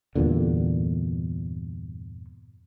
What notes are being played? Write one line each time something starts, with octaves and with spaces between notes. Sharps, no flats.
E2 G2 A#2 D3